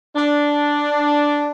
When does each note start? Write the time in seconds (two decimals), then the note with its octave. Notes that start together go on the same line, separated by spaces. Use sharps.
0.16 D4